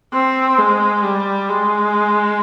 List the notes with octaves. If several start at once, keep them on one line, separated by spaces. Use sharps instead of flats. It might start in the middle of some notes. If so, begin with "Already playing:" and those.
C4
G#3
G3
G#3